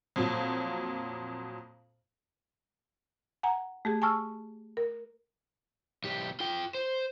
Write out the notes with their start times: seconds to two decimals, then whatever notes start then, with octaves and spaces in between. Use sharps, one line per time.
0.16 F2 A#2 F#3
3.43 F#5 G#5 A#5
3.85 A3 G4 G#4
4.02 G#5 A5 C#6 E6 F6
4.77 A#4
6.04 B1 G4
6.40 F4 G5
6.75 C5